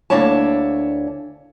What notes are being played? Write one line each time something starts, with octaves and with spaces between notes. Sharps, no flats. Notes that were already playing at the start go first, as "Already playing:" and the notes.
D2 A#3 D4 E4 C#5 A5